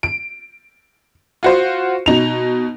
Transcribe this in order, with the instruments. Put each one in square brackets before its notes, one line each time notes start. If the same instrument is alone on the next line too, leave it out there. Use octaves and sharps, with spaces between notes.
[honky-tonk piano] D7
F4 F#4 C5
B2 D#4 F7